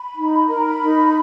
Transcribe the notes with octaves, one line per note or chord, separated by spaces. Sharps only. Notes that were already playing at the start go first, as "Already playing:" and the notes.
Already playing: B5
D#4
A#4 B5
A#5
B5
D#4